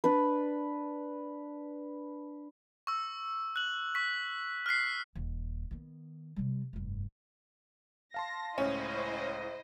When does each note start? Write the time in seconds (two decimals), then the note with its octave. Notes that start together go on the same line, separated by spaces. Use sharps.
0.04 D4 B4
2.87 C#6 E6
3.56 F#6 F#7
3.95 C#6 B6
4.66 F6 F#6 B6 C7
5.15 D#1 D#2
5.71 D#3 B3
6.36 C3 G3
6.73 F1 G2
8.14 F5 A5 C6 A#6
8.58 C#2 A2 C#4 E4 C5 D#5